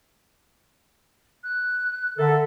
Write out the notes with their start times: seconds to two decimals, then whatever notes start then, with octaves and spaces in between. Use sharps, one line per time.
1.43 F#6
2.18 D3 A4 A#4 E5